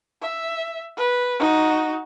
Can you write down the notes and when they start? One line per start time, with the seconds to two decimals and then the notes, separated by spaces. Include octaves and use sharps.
0.22 E5
0.98 B4
1.39 D#4 F#4